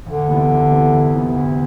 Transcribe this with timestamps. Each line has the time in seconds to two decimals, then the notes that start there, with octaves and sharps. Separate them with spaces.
0.06 D2 D3
0.28 C3 E3 B3 E4
0.50 D2
0.71 C3 E3 B3 E4
0.93 D2
1.14 C3 E3 B3 E4
1.35 D2